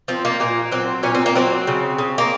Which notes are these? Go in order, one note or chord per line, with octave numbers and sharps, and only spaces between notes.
F3 C4
A#3
A#2 A#3
F#3 C4
A#2 C#4
C4
A#3
F#3 C4
C#3
C#3
A#3